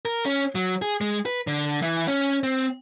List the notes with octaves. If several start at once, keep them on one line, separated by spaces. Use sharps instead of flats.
A#4
C#4
F#3
G#4
G#3
B4
D3
E3
C#4
C4